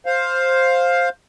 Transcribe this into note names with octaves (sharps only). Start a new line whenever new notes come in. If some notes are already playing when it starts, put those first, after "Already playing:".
C5 F5